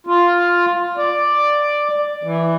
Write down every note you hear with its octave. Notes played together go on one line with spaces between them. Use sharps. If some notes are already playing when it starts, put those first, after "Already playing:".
F4
D5
E3